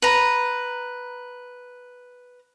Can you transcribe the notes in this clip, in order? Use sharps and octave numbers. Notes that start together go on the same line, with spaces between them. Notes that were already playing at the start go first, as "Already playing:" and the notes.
B4 A#5